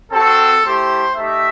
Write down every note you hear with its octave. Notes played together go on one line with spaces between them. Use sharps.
C4 F#4 A4
A3 E4 G4 C5
A3 D#4 G4 E5